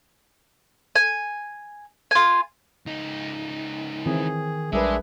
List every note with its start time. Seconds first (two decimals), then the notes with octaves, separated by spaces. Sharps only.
0.96 G#5
2.11 F4 G#5
2.86 C#2 D#4
4.06 D#3 E3 C4 E4 G#4
4.73 A#1 G3 G#3 D4 G#4 A#4 B4 E5